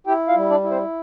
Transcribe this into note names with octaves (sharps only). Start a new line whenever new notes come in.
E4 G4 G5
F4 F5
G3
D4 D5
E4
C4 C5